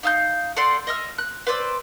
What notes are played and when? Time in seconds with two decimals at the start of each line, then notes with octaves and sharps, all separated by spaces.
0.03 D#4 F5 E6 G6
0.56 A4 D5 F#5 C6
0.87 D#5 E5 F6
1.18 F#6
1.47 B4 C5 D5 E6